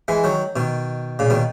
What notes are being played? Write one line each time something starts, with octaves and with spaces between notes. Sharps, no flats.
E3 G#3
D#3 F#3
B2 D#3
A#2 C#3
B2 D#3